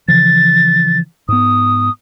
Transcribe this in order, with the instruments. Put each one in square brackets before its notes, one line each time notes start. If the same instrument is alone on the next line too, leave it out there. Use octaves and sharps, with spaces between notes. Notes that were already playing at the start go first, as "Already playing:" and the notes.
[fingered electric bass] C#3 E3 F3 [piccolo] A6
[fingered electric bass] G#2 B3 [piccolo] D#6